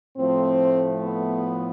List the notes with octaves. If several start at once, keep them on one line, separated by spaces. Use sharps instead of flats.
A2 F3 A3 C4
B3